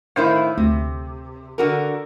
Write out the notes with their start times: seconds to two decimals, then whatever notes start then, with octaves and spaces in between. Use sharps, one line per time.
0.16 A2 D#3 E4 C5 F5
0.58 D2 C3
1.58 D3 F#4 A#4